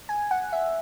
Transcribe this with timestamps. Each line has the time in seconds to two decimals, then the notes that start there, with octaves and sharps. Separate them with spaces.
0.09 G#5
0.31 F#5
0.53 E5